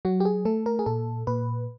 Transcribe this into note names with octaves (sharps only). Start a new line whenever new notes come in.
F#3 F#4
G4
G#4
A3 A4
A#4
G#4
A#2 A4
A#2 B4